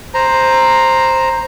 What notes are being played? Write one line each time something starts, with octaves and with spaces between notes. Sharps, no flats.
C5 A#5